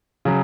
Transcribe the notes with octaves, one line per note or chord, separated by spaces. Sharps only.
C#3 F#3